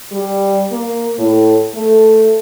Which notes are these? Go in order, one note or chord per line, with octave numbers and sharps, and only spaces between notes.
G3
A#3
A2
A3